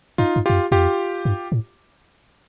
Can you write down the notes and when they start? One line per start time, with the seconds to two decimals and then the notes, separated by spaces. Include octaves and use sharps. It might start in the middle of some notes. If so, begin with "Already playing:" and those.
0.18 G2 D#4 F4
0.36 G2
0.46 F2 F4 G4
0.54 F#2
0.72 F2 F4 G4
1.25 G2
1.52 A2